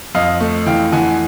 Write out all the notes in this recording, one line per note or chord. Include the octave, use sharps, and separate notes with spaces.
F2 D#5 F5
A3
E3 F5 G5
E3 F#5 G#5